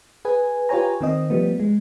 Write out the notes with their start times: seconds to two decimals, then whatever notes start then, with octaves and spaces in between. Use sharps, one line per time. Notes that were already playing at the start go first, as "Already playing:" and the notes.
0.25 G#4 B4 G#5
0.69 F4 G4 B4 C#5 G#5 A#5
1.01 D#3 C4 D#5
1.30 F3 G3 A3 B3
1.60 G#3